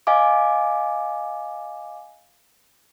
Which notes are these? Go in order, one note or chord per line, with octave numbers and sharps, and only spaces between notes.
D#5 F5 G#5 D6